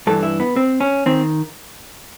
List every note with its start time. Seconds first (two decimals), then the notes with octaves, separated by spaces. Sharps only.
0.07 G2 E3 A4
0.23 E4
0.40 B3
0.56 C4
0.80 C#4
1.06 D#3 C4